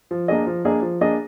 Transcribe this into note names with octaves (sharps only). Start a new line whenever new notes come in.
F3
A#3 D4 G#4 D#5
F3
A#3 D4 G#4 D#5
F3
A#3 D4 G#4 D#5